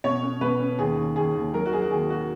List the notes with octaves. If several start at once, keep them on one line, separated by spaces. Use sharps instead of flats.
B2 C#5
C#4
B2 B4
C#4
D#2 G#4
D#2
D#2 G#4
D#2
F#3 A#4
F#4
F#3 G#4
F#4
D#2 G#4
F#4